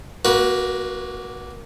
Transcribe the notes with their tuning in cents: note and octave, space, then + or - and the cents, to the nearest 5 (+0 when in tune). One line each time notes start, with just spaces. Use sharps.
A#3 +0 F#4 +0 B4 -35